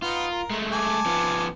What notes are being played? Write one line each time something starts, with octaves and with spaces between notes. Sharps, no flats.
B3 D#4 F4
A#4
G#3 A3
G#5 A5 D6
F3 B3